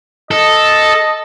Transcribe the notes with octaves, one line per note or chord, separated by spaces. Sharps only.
A4 D#5